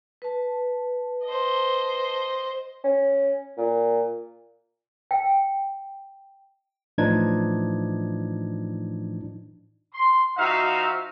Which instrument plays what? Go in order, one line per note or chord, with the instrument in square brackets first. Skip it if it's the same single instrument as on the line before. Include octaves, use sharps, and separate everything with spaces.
[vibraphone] B4 A5
[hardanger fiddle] C5 D#5
[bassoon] C#4
A#2
[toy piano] G5
[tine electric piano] A2 E3 F3 D4 D#4 G#6
[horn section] C6
F3 D#4 F#4 E5 F5